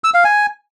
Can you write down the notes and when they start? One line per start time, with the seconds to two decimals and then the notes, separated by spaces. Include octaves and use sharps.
0.04 E6
0.14 F5
0.24 G#5